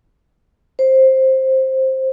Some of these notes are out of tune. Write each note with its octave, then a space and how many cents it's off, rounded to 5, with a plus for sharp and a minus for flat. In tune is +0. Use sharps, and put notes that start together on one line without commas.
C5 +10